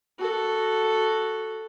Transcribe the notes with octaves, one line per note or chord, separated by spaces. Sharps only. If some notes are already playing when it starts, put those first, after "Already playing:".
F#4 A4